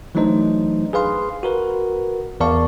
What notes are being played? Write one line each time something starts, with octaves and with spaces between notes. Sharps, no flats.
E3 F#3 A3 D4 D#4 C5
G#4 B4 F5 C6
F#4 A#4 B4
E2 A#4 D5 F5 A5 C#6